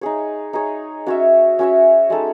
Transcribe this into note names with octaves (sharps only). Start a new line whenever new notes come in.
D#4 G#4 C#5
D#4 G#4 C#5
C#4 F#4 C#5 E5
C#4 F#4 C#5 E5
G#3 D#4 A4